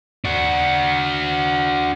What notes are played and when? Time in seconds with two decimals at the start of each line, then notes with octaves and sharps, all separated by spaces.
0.25 D4 F#4